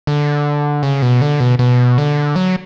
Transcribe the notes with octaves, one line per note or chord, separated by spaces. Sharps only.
D3
C#3
B2
D3
B2
B2
D3
F#3